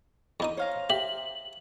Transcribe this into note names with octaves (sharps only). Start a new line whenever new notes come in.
E2 D#4 D#6
C5 C#5 F5 A#5
G4 E5 F#7